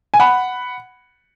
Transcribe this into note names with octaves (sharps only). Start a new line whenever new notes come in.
G#5
F#5 B5